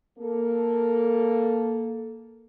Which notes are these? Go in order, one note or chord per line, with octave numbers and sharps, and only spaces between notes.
A#3 A4